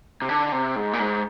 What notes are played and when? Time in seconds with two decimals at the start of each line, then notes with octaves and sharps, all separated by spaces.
0.22 C3
0.29 D3
0.52 C3
0.76 G#2
0.93 A#2
0.99 G#2